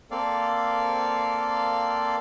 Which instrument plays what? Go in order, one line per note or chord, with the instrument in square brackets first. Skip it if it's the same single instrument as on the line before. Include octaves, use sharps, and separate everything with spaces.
[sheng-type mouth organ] A#3 C4 A4 D5 F5